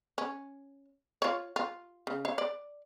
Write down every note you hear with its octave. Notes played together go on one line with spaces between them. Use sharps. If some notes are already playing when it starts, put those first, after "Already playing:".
C#4
F4 C#5
F4
C#3
C#5 F5
D5